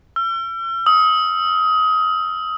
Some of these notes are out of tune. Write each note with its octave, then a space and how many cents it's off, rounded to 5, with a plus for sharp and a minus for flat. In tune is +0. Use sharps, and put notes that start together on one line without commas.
E6 +45
D#6 +25